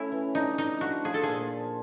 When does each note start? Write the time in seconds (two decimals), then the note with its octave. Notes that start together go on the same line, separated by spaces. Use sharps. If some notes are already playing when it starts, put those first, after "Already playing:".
Already playing: A3 C#4 E4
0.12 E3
0.34 D4 D#4
0.58 D4 D#4
0.81 F3 F#4
1.04 F3 G#4
1.14 A4
1.23 A#2 G#4